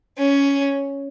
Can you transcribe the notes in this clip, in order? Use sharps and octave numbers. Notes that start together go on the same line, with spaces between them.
C#4